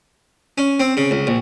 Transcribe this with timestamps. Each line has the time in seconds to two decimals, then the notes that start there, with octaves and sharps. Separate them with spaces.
0.58 C#4
0.80 C4
0.97 C#3
1.11 C#2
1.27 A#1